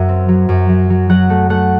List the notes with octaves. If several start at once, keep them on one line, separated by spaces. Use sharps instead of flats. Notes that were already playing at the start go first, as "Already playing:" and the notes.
Already playing: F#2 F#3 E5
C4
F#3
F#2
F#3
F#3
F#3 F#5
A3
A3 F#5